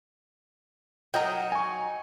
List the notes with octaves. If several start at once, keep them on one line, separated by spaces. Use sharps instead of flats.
F#3 D#4 A#4 D#5 G5
G#5 C#6